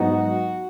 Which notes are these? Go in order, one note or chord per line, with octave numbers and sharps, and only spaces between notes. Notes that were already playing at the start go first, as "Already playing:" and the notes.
Already playing: G#2 F#3 B3 D#4 F#4